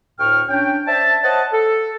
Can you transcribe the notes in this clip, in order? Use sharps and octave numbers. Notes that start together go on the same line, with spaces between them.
D2 A2 G5 C#6 F6
C#4 D4 G5
C5 D5 E5 A5
C5 C#5 D#5 F#5 A5
A4